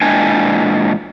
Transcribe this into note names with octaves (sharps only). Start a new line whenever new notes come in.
A#2 E3 G#3 D4 G5 G#5